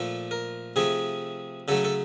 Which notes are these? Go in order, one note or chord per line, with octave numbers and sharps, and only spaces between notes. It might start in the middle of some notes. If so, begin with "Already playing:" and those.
Already playing: A#2 F3 A3 A4
A#4
C3 F3 A3 G#4
C#3 F#3 A3 A4
A4